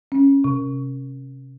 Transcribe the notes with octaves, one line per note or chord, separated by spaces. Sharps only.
C#4
C3